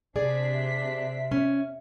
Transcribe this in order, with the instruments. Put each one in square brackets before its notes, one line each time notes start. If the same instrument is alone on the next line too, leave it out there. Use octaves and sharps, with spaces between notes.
[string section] C3 D4 B6 [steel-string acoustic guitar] G#4 D5
[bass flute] E5
[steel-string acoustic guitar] C#4